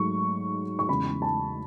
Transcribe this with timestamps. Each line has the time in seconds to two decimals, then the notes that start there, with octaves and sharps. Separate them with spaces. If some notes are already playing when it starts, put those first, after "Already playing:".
Already playing: G#2 F#3 A3 C#6
0.79 C#6
0.89 E2 C#3 E3 G#3 B5
1.22 A5